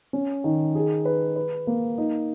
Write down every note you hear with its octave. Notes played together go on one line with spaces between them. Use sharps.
C#4
D#3
G#4
B4
B4
A#3
D#4